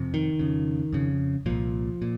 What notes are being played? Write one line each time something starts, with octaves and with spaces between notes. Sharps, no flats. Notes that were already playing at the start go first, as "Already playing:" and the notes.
Already playing: F2 C3
D#3
F2 C#3
F2 C#3
C2 A#2 F3
A#2